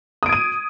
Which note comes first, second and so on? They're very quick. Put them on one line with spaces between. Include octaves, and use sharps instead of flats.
D#6 D7 G#6 D#7